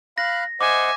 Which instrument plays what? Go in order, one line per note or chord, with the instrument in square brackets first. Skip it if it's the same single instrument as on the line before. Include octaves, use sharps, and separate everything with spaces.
[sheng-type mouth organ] F5 B5 F#6 [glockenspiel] A#6
[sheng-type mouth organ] C5 D#5 F#5 [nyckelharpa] E5 G#5 [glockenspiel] D6